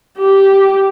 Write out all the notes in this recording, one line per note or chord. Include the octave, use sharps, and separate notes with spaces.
G4